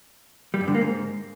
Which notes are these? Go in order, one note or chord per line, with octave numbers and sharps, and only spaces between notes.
G3
G2
D3
A#3
G#2